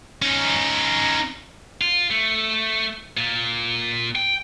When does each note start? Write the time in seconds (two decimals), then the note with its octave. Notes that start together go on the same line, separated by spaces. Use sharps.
0.22 C#4 D#4
1.81 F4
2.10 A3
3.17 A#2
4.15 G5